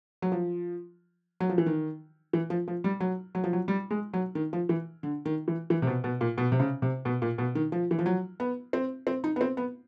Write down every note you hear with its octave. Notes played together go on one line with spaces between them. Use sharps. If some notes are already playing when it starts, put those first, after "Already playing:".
F#3
F3
F#3
F3
E3
D#3
E3
F3
F3
G3
F#3
F#3
F3
F#3
G3
G#3
F#3
D#3
F3
E3
D3
D#3
E3
E3
C3
B2
B2
A#2
B2
C3
C#3
C3
B2
A#2
B2
D#3
F3
E3
F3
F#3
B3
C4
C4
D#4
B3
C4
B3